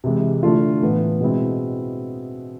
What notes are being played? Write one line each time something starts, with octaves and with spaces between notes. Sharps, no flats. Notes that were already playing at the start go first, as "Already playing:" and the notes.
C3 E3 G#3
D3 A3 D4 F4
A2 E3 B3
B2 G#3 C4 E4